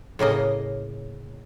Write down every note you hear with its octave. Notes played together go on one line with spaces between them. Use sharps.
A2 C#3 A#3 D#5